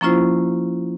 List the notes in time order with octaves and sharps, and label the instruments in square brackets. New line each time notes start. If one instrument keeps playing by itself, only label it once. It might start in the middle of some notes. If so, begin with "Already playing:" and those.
[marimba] F3 A#3 C#4 E4 F4 C5